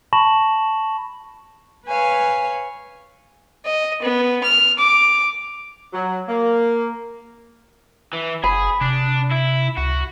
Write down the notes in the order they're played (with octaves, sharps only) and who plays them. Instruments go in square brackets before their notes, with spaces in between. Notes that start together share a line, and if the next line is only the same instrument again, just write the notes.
[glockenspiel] A5 B5 C#6 A#6 E7 F#7
[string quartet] B4 C#5 F5 G#5
[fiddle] D#5
B3
F6
D6
[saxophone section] F#3
A#3
[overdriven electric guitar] E3
[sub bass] F#1 [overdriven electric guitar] G#4 [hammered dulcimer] B5
[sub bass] C3 [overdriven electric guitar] D4
[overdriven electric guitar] E4
[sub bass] C#2 [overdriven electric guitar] F#4